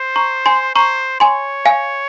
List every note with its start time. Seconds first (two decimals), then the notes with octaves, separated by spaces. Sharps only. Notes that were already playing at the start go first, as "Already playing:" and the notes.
Already playing: C5
0.16 A#5 C#6
0.46 G#5 C6
0.75 C5 A#5 C#6
1.20 C#5 G#5 C6
1.66 F5 G#5